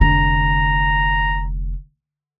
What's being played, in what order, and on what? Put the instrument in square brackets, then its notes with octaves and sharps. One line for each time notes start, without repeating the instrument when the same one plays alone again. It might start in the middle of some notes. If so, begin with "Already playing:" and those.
[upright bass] F1 D3 [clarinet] A#5